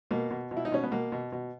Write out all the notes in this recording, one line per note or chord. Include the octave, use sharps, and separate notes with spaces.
B2 A#3
B2
B2
E4
D#4
B2 C#4
B3
B2 A#3
B2
B2